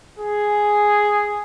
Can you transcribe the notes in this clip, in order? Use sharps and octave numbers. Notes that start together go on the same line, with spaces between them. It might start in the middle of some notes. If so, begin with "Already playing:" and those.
G#4